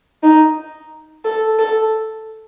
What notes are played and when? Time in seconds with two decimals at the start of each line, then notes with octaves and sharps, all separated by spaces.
0.23 D#4
1.24 A4
1.59 A4